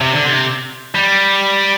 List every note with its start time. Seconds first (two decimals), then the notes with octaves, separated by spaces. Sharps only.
0.01 C3
0.13 D3
0.24 C3
0.95 G3